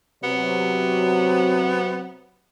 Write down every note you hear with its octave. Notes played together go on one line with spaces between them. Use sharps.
C3 F#3 B3